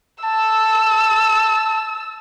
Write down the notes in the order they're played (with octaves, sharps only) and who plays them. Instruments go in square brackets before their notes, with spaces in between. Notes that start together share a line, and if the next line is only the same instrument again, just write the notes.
[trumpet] A5 [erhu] E6